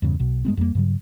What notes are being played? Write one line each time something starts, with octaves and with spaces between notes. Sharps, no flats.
E2 G2 C#3
B1 B2
G2 G#3 B3 C4
F2 G3 A#3
G2 C#3 F#3